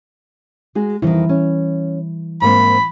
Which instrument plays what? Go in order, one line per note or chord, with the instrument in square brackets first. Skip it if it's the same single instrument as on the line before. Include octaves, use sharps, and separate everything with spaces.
[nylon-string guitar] G#3 F#4 G#4
[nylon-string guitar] F2 D#3 [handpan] E3 G3 E4
[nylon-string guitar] C#4
[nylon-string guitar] G#2 A#3 C4 [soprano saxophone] B5